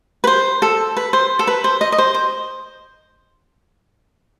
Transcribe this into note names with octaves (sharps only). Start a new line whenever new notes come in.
B4
C5
A4
B4
C5
A4
B4
C5
D#5
D#5
C5
C5